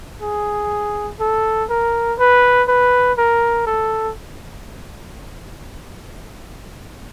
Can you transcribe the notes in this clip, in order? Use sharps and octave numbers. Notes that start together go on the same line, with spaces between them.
G#4
A4
A#4
B4
B4
A#4
A4